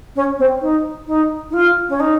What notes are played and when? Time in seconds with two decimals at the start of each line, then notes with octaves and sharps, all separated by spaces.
0.15 C#4
0.38 C4
0.61 D#4
1.07 D#4
1.50 D#4
1.53 F4
1.89 C#4
2.00 D#4